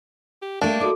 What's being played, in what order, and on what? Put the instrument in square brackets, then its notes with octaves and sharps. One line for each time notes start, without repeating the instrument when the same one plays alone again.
[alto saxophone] G4
[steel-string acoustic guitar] A3 G4 [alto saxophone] A#3 [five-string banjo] D4
[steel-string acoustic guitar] D#4 D5 [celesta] F#4 A4 D6